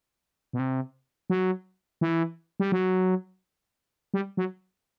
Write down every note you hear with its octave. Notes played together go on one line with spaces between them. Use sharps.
B2
C3
F#3
E3
G3
F#3
G3
F#3